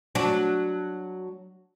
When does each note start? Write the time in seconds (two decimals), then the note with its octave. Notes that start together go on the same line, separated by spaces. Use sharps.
0.15 F#3 D4